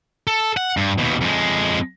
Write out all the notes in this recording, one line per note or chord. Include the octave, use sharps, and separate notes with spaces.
A4
F#5
G2
D#2 B2
F2 G#3